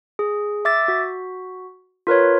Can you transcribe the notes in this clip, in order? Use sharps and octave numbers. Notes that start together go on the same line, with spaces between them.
G#4
E5 D6 E6 A6
F#4
F4 A#4 B4 C#5